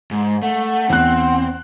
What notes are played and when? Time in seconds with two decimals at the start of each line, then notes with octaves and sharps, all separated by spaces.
0.11 G#2
0.42 A3 F#5
0.66 F#5
0.90 E2 C4 F#6